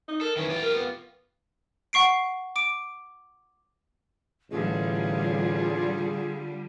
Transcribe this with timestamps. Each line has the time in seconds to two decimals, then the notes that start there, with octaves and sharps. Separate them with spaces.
0.08 D#4
0.21 A4 A#4
0.36 D#3 E3 C#4
0.50 F4 G4
0.62 A#4
0.75 B3
1.93 F#5 C#6 C7 D7
2.56 D6 D7
4.51 A1 D3 G3 F4 G#4